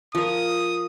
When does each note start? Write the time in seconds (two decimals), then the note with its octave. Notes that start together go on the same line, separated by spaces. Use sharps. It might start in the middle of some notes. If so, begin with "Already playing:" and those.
0.15 F3 A#4 D#6